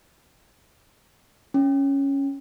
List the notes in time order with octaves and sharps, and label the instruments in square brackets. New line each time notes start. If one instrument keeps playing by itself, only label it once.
[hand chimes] C#4